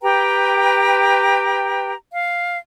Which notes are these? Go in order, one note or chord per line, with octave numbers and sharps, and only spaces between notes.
G4 B4 G5 A#5
F5